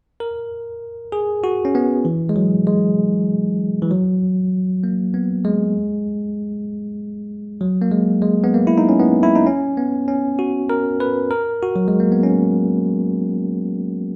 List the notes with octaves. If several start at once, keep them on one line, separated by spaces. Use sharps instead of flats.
A#4
G#4
F#4
C#4
B3
E3
G#3
F#3
G#3
E3
F#3
A#3
B3
G#3
F#3
A#3
G#3
G#3
B3
A#3
E4
D#4
C#4
B3
E4
D#4
C#4
B3
C#4
F#4
A#4
B4
A#4
F#4
F#3
G#3
A#3
B3
C#4